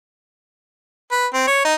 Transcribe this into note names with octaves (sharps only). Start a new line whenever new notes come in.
B4
C4
C#5
D#4